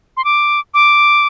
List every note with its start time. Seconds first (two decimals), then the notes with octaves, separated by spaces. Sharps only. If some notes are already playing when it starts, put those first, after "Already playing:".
0.17 C6
0.25 D6
0.74 D6